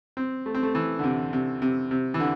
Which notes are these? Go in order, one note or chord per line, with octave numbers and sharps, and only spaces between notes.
C4
A3
C4
A3
E3
D3
C3
C3
C3
C3
E3
D3